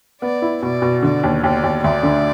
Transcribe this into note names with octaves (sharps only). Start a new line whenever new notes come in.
B3 D5
E4
B2 D5
B2
D3 D5
D#2
D#2 D5
D#2
D2 D5
D3